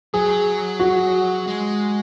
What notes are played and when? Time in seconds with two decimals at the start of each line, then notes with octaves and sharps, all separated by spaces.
0.14 F#3 G#4
0.80 F#4
1.47 G#3